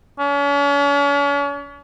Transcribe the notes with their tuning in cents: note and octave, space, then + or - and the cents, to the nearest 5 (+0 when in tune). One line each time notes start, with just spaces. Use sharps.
C#4 +40